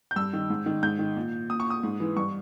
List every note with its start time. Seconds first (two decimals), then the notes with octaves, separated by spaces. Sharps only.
0.11 G6
0.16 G2 E6
0.33 D#3
0.50 G#2
0.66 D#3
0.83 G#2 G6
0.99 D#3
1.16 A#2
1.50 A#2 D#6
1.60 C#6
1.70 D#6
1.83 G#2
2.00 E3
2.16 G2 C#6